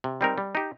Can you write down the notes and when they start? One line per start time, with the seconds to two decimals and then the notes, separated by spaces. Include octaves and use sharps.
0.04 C3
0.21 G3 C4 D#4 A#4
0.38 G3
0.55 D#4 G4